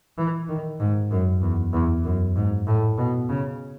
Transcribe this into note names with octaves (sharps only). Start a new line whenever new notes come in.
E3
D#3
G#2
F#2
E2
E2
F#2
G#2
A2
B2
C#3